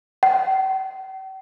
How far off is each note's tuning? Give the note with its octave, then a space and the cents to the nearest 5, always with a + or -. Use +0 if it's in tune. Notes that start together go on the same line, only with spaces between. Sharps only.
G5 -45